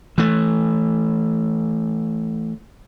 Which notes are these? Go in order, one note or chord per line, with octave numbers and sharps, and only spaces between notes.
E3 A3